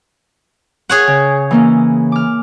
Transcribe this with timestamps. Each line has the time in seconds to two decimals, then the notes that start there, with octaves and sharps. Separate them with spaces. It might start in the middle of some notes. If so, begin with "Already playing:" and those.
0.89 G#4 C#5 F#5
1.08 C#3
1.51 E3 A#3 C#4
2.12 D6 F6